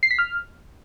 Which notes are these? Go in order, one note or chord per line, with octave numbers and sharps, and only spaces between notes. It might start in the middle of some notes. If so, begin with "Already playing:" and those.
C7
B6
F6